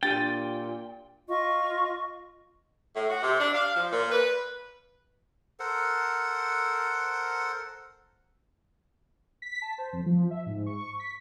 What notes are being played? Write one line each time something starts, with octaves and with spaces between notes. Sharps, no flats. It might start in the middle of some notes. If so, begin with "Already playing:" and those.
A#2 D4 G4 G5 A6 D#7
F4 D#5 C#6
A2
F#4
C3
D4
F5
F3
A#2
B4
A4 A#4 C5 F#5
B6
A5
C5
F2
F3
E5
G#2
C#6
B6